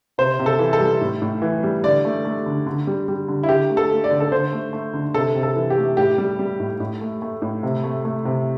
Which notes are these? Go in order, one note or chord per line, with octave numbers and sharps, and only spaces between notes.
C3 C5
C3
A4
E3
A4
G3
A2
A2
E3
G3
D3 D5
A3
A3
D3
D3
G3
G3
D3
E4
D3 G4
A3
A4
A3
D5
D3
A4
D3 C5
A3
A3
D3
C3 A4
C3
A4
E3
G4
A3
A2 G4
G3
G3
A2
A2
A3
A3
A2
C3
A3
A3
C3